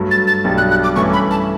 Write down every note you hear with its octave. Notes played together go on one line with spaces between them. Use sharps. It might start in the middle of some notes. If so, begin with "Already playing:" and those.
Already playing: G2 F#3 A3
A6
A6
B1 B2 G3 D4
F#6
F#6
D6
G2 E3 A3 C#4 E4 C#6
B5
A5